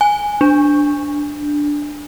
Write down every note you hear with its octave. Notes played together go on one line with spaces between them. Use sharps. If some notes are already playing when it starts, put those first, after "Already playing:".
G#5
D4